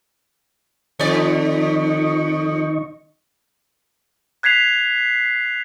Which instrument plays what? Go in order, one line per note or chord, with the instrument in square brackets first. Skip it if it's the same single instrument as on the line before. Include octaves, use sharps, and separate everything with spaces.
[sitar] F2 D5 [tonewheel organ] D#3 D#5 C#6
[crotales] F#6 G#6 B6 C7 F7